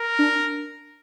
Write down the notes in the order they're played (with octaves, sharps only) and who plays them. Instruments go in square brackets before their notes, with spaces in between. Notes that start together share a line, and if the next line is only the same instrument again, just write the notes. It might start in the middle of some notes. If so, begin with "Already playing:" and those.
Already playing: [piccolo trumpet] A#4
[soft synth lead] D4